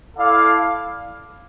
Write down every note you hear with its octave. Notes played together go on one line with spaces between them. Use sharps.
E4 A4 D5 F5